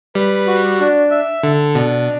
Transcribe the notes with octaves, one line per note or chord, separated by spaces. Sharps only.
G3 B4
F#4
D4
E5
D3 A4
B2 D4